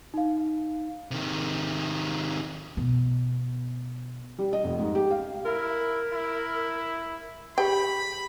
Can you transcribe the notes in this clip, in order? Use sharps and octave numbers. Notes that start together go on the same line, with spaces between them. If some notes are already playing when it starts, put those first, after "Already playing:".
D#4 F5
C3 D#3
B2 B3
G3
D#5
F1
G#2
G4
F5
E4 A#4
E4
G4 G#4 G5 B5 C#6